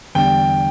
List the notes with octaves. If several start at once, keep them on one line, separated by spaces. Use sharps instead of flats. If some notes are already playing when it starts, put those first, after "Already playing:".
E2 D3 G3 D4 G5